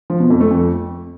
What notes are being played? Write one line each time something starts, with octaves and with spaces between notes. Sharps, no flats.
F3
B2
F2
A3
F2